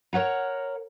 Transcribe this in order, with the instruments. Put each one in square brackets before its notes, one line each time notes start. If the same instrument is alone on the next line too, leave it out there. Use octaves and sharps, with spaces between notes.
[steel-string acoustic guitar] A#4 C#5 F#5 A#5